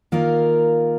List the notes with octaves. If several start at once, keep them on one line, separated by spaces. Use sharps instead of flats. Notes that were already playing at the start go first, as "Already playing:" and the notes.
D#3 A#3 F4 A#4